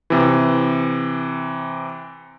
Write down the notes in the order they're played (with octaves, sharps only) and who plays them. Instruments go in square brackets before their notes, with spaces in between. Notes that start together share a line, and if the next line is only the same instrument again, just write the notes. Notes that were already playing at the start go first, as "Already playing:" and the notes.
[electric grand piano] C3 E3